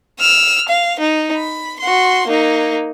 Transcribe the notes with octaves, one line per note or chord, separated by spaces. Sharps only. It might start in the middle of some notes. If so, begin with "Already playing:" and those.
E6 F6
F5
D#4
B5
F#4 C6
A#3 D#4